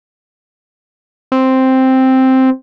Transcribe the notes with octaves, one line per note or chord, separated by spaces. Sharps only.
C4